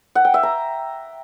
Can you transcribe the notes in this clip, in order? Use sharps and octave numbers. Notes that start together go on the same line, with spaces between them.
F#5
G5
E5
A#5